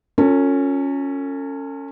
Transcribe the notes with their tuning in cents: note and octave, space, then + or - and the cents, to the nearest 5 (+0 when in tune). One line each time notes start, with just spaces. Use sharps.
C#4 +0 F4 +30 A4 +40